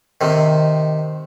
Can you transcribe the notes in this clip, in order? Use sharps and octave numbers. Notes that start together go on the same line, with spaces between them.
C3 D#3